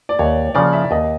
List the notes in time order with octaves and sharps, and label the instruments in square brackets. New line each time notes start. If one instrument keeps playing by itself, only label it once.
[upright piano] D5
[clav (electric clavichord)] D#2 [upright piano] C#5
[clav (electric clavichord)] C#3 F3 A#3 [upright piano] D5
[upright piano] E5
[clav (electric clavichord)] D#2 [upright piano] D#5